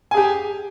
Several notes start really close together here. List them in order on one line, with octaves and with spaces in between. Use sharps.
G#5 G#4 G4